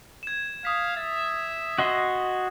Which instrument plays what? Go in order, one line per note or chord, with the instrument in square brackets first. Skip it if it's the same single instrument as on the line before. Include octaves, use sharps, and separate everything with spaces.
[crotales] G#6 E7
[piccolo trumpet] F5 [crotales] D#6 B6
[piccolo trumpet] E5 [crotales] A6
[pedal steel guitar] F#4 D#5 C6